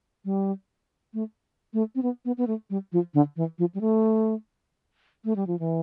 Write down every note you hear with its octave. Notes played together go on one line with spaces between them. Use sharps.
G3
A3
A3
C4
B3
B3
B3
A3
G3
F3
D3
E3
F3
G3
A3
A3
G3
F3
E3